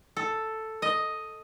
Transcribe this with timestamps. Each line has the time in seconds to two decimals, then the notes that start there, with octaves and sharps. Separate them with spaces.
0.17 A4
0.82 D#5